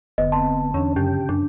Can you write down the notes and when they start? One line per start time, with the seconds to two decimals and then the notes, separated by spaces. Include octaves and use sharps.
0.18 F1 D3 B3 D#5
0.32 C4 A5 C6
0.74 E2 C#4 D4 C#5
0.96 F#2 C#3 G4 G5
1.29 F#2 D4